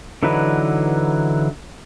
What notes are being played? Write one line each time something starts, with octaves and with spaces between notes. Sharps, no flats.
D3 E3 F#3 D#4 B4